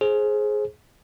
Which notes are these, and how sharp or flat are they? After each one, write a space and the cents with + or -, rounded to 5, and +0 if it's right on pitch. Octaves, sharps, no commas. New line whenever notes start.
G#4 +15 C5 +25